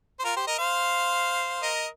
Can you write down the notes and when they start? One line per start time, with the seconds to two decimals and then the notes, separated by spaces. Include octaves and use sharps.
0.20 C5
0.25 F4 A#4
0.36 G4 C5
0.47 A#4 D#5
0.59 C5 F5
1.62 A#4 D#5